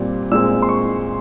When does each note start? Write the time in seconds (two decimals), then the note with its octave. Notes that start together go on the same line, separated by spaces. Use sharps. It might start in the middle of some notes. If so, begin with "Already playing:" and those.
Already playing: A#2 G3 C4
0.32 A#2 G#3 C4 E6
0.62 C6
0.69 C#6